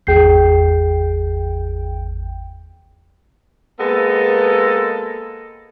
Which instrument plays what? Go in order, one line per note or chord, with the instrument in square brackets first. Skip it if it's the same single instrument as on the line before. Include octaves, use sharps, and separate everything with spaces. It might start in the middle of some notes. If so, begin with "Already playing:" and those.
[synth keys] G#1 E2 G5 [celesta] G#4 G6 C7
[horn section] G#3 A#3 B3 A4